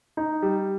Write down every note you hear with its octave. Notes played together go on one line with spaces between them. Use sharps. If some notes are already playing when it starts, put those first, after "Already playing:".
D#4
G3